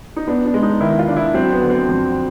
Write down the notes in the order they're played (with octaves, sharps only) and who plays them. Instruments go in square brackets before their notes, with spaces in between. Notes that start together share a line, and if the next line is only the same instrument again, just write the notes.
[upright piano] D#4
[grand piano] B3 [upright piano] D4
[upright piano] D4
[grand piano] G#3
[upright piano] D#4
[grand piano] D#3 [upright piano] E4
[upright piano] F4
[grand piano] D4
[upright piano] E4
[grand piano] F#3 [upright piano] C4
[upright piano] B3
[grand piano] D3
[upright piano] C4
[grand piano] F2